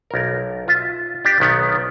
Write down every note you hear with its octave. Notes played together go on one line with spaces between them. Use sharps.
B1 A#4
F4 E5
D4 G4
B1 D#3 B3